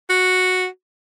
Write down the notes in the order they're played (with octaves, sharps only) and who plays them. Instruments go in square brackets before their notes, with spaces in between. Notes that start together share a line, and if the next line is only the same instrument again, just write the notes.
[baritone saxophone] F#4